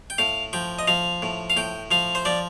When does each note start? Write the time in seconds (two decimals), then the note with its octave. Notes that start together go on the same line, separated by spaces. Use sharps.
0.10 G5
0.18 A2 F5
0.53 F3 G5
0.79 D#5
0.88 F3 F5
1.22 A2
1.50 F5
1.57 A2 G5
1.91 F3 F5
2.15 C5
2.25 F3 D5